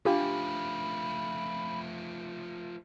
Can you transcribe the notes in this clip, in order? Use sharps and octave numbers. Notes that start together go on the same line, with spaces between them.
F3 A3 D4 F4 G4 F5 B5